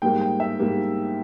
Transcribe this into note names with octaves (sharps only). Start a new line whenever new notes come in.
G#2 G3 A#3 G5
G5
E5
G#2 G3 A#3